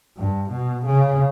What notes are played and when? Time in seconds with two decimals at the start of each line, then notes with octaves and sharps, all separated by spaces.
0.17 G2
0.51 B2
0.86 C#3